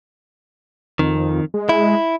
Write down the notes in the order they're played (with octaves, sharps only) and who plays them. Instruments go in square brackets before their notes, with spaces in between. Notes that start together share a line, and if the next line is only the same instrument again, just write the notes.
[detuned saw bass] F2 [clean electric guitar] D#3
[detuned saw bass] G#3
[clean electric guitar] E4